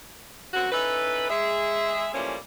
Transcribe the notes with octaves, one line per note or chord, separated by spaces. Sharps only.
F#2 F#3 C4 F#4
C#4 D#4 E4 A4 B4
G#3 G#4 E5
E3 F3 G3 A3 A#3 C#4